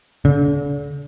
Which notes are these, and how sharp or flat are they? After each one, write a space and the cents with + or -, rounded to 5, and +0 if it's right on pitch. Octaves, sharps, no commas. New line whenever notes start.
D3 -40